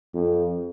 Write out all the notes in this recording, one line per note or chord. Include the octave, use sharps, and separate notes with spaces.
F2